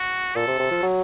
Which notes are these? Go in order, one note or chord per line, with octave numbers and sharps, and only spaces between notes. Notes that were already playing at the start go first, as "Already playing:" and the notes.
Already playing: F#4
A#2 A4
C3
C3
F3
F#3